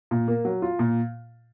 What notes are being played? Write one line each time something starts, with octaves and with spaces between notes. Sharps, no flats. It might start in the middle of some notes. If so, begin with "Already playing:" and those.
A#2
A#3
F#3
F4
A#2